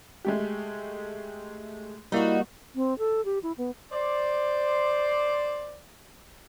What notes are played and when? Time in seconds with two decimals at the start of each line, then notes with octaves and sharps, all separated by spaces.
0.25 G#3 A3 G4
2.12 G3 A#3 D#4 E4 F#4
2.75 C4
2.99 A4
3.25 G4
3.43 E4
3.58 B3
3.92 C5 D5